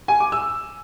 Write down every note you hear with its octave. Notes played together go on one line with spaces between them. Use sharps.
G#5
D6
E6